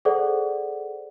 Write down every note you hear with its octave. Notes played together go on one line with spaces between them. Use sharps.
G#4 A4 C5 D5 F#5